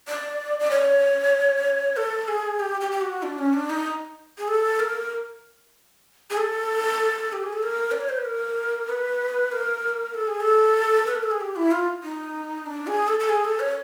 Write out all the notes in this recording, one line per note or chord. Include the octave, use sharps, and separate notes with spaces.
D5
D5
C#5
A4
G#4
G4
G4
G4
F#4
D4
C#4
D4
D#4
G#4
A4
A#4
G#4
A4
G4
G#4
A4
A#4
D5
C#5
C5
B4
A#4
B4
A#4
A4
G#4
A4
B4
A#4
A4
G#4
G4
E4
F4
D#4
D4
G#4
A4
A4
G#4
A4
C#5